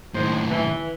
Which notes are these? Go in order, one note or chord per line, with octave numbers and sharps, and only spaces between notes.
D#2 A2 D#3 G#3 C5
E3